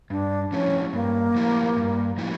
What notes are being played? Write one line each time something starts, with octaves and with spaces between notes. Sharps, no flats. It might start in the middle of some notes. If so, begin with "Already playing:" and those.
G2 D4
F3 A3 C#4 E4 G4
G2 A#3
F3 A3 E4 G4
G2
F3 A3 E4 G4